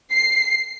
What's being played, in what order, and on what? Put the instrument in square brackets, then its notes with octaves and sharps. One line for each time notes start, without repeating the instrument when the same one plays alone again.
[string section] C7